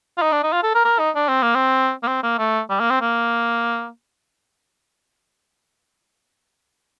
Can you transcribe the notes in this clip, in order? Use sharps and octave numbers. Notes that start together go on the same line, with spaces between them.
F4
D#4
D4
D#4
F4
A4
A#4
A#4
D#4
D4
C4
A#3
C4
A#3
C4
A#3
A3
G3
A#3
C4
A#3